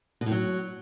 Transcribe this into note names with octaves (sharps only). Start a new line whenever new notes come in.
B2
A2
F#3